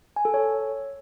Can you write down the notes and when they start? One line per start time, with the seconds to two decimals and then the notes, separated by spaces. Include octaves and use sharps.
0.16 G#5
0.25 A4
0.34 C#5